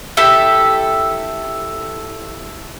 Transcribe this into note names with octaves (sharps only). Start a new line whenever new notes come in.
E4 G4 A4 E5